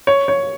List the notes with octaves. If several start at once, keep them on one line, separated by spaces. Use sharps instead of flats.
C#5
C#5